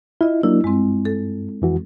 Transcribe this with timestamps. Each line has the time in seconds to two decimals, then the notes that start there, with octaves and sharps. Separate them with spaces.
0.21 E4 F4 D#5
0.43 F#3 A#3 D4 E4
0.64 G2 G#3 C4
1.05 A4
1.62 F2 E3 F#4